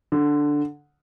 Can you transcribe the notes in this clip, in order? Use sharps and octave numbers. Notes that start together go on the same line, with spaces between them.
D3